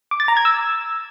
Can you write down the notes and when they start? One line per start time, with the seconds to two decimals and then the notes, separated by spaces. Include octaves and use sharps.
0.11 D6
0.20 A6
0.28 A#5
0.37 G#6
0.45 E6